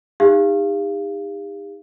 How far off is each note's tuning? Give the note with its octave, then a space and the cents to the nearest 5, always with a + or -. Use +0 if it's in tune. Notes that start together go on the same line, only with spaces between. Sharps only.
D#4 +0 G4 +45 F5 -25